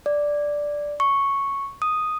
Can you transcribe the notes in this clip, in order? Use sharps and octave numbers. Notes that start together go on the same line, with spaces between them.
D5
C#6
D#6